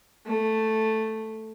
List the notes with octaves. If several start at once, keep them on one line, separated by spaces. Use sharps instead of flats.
A3